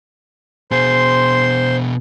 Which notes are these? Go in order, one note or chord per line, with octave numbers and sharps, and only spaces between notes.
B2 G#4 C5 C6